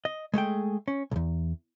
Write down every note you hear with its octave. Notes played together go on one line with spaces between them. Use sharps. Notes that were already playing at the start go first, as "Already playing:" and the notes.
D#5
G#3 A3 G#4 G5
C#4
B1 E2